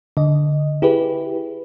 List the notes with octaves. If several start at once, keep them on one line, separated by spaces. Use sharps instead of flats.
D3 D#5
E4 G4 G#4 B4